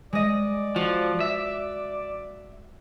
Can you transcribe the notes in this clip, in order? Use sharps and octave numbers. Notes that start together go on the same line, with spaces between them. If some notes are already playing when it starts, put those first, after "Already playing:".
G#3 D5 D#5
F3 F#4
E5